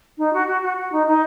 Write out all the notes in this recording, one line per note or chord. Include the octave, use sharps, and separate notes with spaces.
D#4
F#4
F#4
F#4
F#4
D#4
D#4